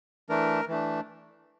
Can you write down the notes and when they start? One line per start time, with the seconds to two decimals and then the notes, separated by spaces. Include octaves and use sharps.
0.29 E3 A3 D4 A#4
0.68 E3 A3 D4